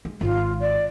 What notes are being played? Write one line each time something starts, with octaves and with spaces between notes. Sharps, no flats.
G#3
G#1 F4
D5